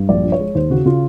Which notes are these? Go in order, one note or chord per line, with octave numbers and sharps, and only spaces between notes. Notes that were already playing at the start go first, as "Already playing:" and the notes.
Already playing: G2
A#1 D5
F3
C#5
G#3
D#2 C5
C#3 F#4
C#3 F4